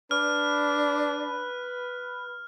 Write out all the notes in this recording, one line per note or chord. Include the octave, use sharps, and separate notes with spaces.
D4 B4 F6